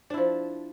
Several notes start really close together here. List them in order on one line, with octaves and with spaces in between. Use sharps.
D4 E4 F3